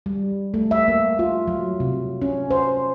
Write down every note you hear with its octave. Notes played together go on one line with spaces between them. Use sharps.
G3
A3
E5
A#3
F4
F#3
C3
C#4
C5